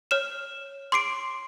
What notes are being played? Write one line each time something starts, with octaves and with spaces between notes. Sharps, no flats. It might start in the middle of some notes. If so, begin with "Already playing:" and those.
C#5 F6 E7
C6 D6 C7 D7